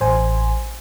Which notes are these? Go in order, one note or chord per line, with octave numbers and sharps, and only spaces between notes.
A1 C5 G#5